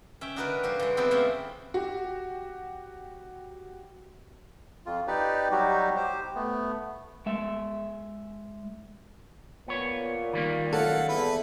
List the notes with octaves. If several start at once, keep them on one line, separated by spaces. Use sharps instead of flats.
C#4 E5 G5
D4 D#4 F#4 A#4 B4 D5
F3 F#4 G4 A4
E3 G#3
B3 C4 E4 F#4 G4 A4
E3 G#3 A3 C#4 F4 E5
F#4 G4
F2 F4
D#4 G4 B4 D5
F#3 G3 D#4 F#4 G4
G4 C5
A3 B3
G#3 E5
A#2 B3 C#5
D#3 G3 A#3
F#2 A4 F5 F#5
E2 E4 B4